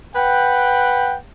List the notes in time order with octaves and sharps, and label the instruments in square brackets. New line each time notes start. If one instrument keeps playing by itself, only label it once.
[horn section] B4 F#5 G5